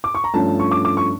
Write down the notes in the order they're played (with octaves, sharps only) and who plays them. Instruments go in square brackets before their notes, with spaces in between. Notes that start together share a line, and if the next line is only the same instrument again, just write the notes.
[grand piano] D6
C#6
A#5
G2 F3 A3 C#4 A5
C#6
D6
D6
C#6